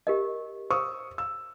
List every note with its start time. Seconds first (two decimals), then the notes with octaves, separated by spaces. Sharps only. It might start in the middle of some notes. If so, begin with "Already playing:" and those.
0.07 G4 A#4 D#5
0.71 C5 C#6 D#6 E6
1.18 E6